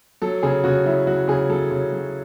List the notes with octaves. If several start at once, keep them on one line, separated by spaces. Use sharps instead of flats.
F#3 A4
C#3 G#4
C#3 F#4
F#3 E4
F#3 F#4
C#3 G#4
F#3 A4
C#3
F#3